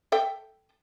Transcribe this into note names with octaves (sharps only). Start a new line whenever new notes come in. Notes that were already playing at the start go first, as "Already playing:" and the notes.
A4 E5 G5